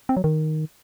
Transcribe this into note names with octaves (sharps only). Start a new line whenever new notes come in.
C4
F#3
D#3